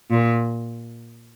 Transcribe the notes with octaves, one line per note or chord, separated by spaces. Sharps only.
A#2